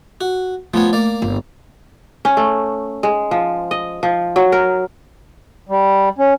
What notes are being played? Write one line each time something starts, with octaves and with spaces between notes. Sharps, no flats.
F#4
F3 A3 B3 C#5
A#3 D5
G1
C#4
A3
G#3
F3
D#5
F3
F#3
A#4
G3
C#4